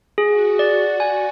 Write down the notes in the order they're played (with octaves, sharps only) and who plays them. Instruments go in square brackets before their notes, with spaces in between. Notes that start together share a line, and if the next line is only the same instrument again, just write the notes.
[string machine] F#4 [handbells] G#4
[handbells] D5
G#5